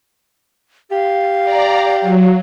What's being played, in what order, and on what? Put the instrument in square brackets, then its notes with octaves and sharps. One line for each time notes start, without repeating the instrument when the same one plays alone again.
[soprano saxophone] G4 [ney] F5
[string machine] D5 A#5
F#3